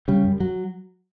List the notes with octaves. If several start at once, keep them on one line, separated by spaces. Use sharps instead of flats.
C#3 G3
F#2
F#3